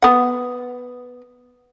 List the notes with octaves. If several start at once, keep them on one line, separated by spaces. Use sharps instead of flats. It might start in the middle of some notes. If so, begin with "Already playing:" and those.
B3 F#5